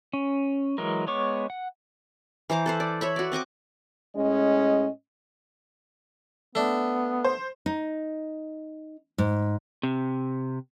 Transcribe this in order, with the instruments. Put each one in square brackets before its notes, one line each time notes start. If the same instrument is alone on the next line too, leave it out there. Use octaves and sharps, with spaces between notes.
[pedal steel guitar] C#4
E3 F#3 G#3 A#4
G#3 B3 C#5 C#6 D6
F#5
[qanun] E3 C5 A#5 D6
A4 B4 C5
D5
C#5 E5 B5
F#4 D5
C4 D#5 C#6 D6
[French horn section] A2 G#3 C#4 D#5
[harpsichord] A3 D4 [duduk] B3
[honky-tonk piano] C5
[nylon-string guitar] D#4
G#2
[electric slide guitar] C3